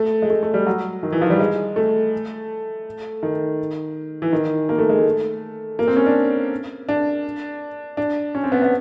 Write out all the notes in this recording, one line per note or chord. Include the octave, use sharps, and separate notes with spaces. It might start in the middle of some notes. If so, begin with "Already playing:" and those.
Already playing: A3
G#3
A3
A3
G3
F#3
D#3
E3
F3
G3
G#3
A3
D#3
E3
D#3
A#3
A3
G#3
A3
A#3
C4
C#4
D4
D4
D4
C#4
C4
B3
B3